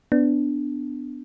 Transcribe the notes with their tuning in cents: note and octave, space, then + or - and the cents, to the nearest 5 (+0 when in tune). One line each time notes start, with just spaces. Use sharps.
B3 +15 D4 +0